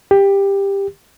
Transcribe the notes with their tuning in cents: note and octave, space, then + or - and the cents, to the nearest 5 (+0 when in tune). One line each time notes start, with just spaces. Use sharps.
G4 +15